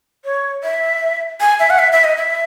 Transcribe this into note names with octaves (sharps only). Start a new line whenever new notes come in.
C#5
E5
G#5
E5
F#5
E5
E5
D#5
E5